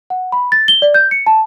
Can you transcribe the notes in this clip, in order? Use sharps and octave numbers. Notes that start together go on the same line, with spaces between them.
F#5
B5
A6
G7
D5
G6
C#7
A5